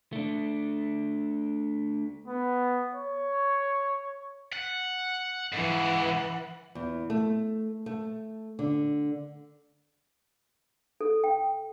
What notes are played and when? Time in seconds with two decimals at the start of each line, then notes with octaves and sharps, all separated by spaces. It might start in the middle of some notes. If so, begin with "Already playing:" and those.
0.13 A3 D4
2.27 B3
2.94 C#5
4.52 F#5
5.52 G#2 C#3 E3 F#5
6.75 E2
7.10 A3
7.86 A3
8.59 D3
11.01 A4
11.24 G5